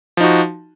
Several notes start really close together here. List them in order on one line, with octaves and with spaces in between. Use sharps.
F3 D#4 F#4